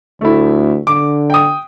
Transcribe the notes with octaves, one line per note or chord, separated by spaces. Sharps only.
D2 A3 E4
D3 D6
G5 D#6